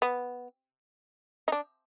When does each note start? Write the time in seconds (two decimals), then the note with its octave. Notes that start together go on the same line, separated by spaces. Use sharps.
0.02 B3
1.48 D#4
1.52 D4